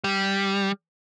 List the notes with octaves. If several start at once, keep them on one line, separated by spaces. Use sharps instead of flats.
G3